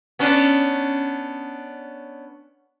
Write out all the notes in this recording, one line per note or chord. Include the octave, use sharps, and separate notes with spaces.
B3 C#4 D4